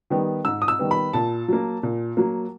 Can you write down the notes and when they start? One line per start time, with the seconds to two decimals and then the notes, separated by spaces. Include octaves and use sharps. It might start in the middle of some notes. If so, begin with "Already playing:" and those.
0.10 D#3 G3 B3
0.45 G#2 E6
0.62 D#6
0.68 E6
0.79 D#3 G3 B3
0.91 B5
1.13 A#2 A5
1.48 F#3 A#3
1.83 A#2
2.17 F#3 A#3